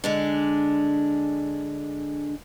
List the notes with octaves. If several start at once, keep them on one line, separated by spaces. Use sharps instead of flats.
D3 G#3 D4